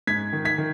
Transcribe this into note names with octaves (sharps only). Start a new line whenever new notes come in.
G#2 G#6 B6
D#3
G#6 B6
D#3